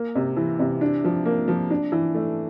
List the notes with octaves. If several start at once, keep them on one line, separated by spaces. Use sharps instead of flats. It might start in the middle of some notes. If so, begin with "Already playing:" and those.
Already playing: A#3
C3
E3
C3
D4
F3
A#3
F3
D4
E3
A3